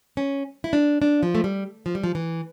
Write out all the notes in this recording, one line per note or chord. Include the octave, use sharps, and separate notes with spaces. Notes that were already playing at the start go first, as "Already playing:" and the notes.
C#4
E4
D4
D4
F3
A3
G3
F3
G3
F3
E3